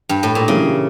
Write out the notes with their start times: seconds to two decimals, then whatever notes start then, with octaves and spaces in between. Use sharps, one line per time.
0.09 G2
0.23 A2
0.35 A#2
0.47 C#3 E3 G3 A#3 C#4 E4